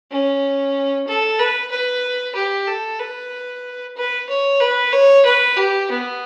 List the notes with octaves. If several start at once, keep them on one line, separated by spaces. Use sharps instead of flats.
C#4
A4
B4
B4
G4
A4
B4
B4
C#5
B4
C#5
B4
G4
B3